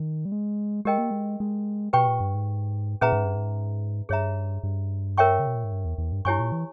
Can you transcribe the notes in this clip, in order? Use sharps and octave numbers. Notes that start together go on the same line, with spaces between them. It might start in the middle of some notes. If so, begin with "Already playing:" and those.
Already playing: D#3
G3
G#3
G#3 G4 A#4 D#5 G5
A#3
G#3
G#3
B2 G4 B4 G5 C#6
A#2
G2
G#2
A#2 C#4 G#4 B4 E5 A#5
G#2
G2
G#2
G2 G#4 C#5 E5 A#5
G2
A#4 C#5 E5 G5 C#6
C#3
B2
A#2
G#2
G2
E2
E2
G2
G2 E4 G4 C#5 G#5 C#6
A#2
E3